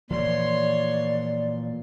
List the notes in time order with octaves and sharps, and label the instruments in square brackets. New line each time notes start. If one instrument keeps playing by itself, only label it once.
[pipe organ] A#2 [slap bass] E3 F3 A3 [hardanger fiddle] C#5 C6 [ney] D5